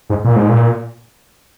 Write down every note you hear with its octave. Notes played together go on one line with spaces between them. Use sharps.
G#2
A#2
G#2
A#2